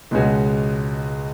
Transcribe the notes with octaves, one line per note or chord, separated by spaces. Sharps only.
C#2 B2 G#3 C#4 F#4